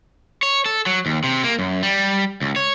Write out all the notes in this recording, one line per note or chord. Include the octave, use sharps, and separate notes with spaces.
C#5
A4
F#3
D#2
C3
A#3
F#2
G3
C#2
C#5